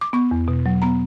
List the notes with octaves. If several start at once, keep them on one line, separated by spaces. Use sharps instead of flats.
D6
B3 C#6
E2
B2
F#3
B3 A#5